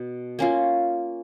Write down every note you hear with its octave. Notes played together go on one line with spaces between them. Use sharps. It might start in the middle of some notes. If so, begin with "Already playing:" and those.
Already playing: B2
A#3 C#4 F4